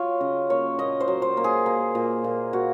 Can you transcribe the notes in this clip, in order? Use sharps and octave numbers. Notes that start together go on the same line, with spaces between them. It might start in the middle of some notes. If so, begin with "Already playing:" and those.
Already playing: F#3 F4 C#5
C#3 D#5
A#3 C#5
A#2 D#5
C5
F#3
C5
A#3
G#4
A#3
A#2
A#2
A#3 F#4